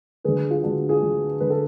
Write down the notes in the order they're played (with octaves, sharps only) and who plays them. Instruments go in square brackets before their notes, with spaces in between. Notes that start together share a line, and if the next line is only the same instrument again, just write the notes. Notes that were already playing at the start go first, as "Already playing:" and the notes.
[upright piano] D2 D3 G#4 B4
F4 G#4
D2 D3 D4 F#4
F4 G#4
D2 D3
D2 D3 B4
A4